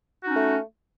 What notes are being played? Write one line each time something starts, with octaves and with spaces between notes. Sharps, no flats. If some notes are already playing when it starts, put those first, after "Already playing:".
A3 C#4 D#4 F#4